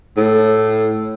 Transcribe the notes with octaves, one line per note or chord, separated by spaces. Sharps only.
A2